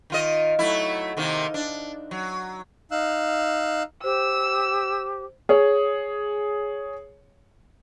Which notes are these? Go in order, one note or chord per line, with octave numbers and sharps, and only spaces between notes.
D#3 F4 D#5
F#3 A3 E4
C3 D#3 A#3
D4
F#3
D#4 F5 E6 F#6
G4 C5 E6
G#4 C#5